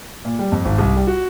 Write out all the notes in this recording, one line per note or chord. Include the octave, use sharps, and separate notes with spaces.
A#2
G3
F2
G#1
C2
G3
F#4